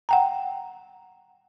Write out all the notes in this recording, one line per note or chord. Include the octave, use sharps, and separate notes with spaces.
F#5 G5 A#5